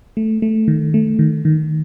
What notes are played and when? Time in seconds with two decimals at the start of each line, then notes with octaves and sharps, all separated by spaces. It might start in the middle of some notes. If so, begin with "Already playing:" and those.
0.17 A3
0.42 A3
0.68 D#3
0.94 A3
1.19 D#3
1.45 D#3